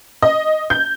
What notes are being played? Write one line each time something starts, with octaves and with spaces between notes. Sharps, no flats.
D#5
G6